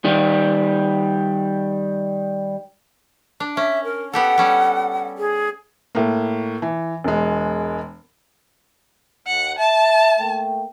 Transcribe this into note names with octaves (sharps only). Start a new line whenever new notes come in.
D#3 G3
D4
C#4 E5
A#4
B3 G4 A4 F#5
G3 C#4 A4
G#4
A2 A#3
E3
E1 G#3
D#2 F#5
E5 A5
A3 A#3 G5